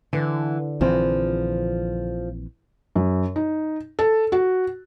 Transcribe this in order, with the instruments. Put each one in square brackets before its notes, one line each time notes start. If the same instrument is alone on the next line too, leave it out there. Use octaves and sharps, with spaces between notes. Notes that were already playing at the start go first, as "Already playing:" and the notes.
[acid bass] D3 [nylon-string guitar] E3
[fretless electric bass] A#1 E3 C4 [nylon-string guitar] F3
[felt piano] F#2
D#4
A4
F#4